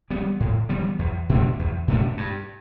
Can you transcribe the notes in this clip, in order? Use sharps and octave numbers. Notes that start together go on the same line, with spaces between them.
E3 G3 B3
A2
E3 G3 B3
E2
B2 A3 D4
E2
B2 A3 D4
G2